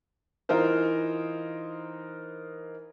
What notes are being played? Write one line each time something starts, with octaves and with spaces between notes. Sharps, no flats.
E3 D#4 F4 A#4 C5